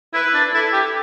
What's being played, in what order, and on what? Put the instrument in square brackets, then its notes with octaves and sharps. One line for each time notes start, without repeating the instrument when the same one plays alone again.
[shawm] E4 [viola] B4
[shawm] D4
[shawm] E4 [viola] A4
[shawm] G4